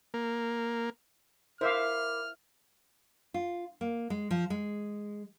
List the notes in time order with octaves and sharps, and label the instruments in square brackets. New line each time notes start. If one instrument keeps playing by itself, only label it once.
[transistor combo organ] A#3
[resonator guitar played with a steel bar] E4 [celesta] A#4 D6 [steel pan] C5 E5 F5 [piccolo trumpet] F6
[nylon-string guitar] F4
A#3
G#3
F3
G#3